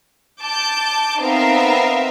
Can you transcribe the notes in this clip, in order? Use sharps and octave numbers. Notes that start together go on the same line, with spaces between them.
A5 D6 G6
B3 C4 D#4 A#4 E5 F5